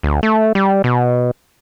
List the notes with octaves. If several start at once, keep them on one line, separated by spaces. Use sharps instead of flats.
D2
A3
G3
B2